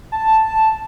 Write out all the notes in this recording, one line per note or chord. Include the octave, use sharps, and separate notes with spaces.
A5